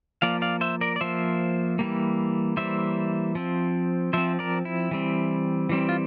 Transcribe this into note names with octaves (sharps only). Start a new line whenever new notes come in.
F3 A#3 D5 F5
D5 F5
C5 E5
A#4 D5
D5
F3 A#3 C5 E5
E3 G3 A#3
E3 G3 A#3 C5 E5
F3 C4
F3 C4 C5 E5
A#4 D5
E4
E3 G3 C4
E3 G3 C4
F4